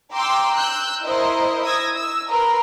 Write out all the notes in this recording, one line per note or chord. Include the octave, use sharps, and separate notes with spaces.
G5 A#5 C6 D6 E6
E6 F#6 G6
E4 A#4 C5 D#5
D#6 E6 G#6 A#6
E6
A#4 B4 A#5 C6